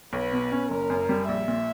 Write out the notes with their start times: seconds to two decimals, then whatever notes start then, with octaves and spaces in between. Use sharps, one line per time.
0.13 B1 B4
0.32 B2
0.52 C#4
0.70 F#1 A#4
0.90 F#2
1.09 G3
1.28 A#1 E5
1.48 A#2